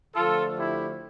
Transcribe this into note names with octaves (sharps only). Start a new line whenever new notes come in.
D3 F3 A3 F4 A4
E4 G4